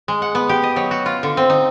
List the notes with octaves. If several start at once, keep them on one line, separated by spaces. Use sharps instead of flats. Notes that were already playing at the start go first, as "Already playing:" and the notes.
G#3
F#5
B3
G4
D#5
F#3
F#4
F4
D3
C4
D#4